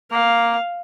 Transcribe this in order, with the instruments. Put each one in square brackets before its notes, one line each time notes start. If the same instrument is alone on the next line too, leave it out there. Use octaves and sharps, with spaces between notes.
[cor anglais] A#3 [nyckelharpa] F5